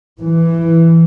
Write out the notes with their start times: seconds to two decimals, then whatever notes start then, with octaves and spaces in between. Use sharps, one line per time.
0.22 E3